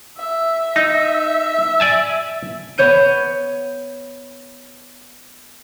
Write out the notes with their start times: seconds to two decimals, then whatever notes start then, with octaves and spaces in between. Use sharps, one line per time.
0.17 E5
0.76 D#4
1.80 D5 G#5 A5
2.78 B3 C#5 G6 D#7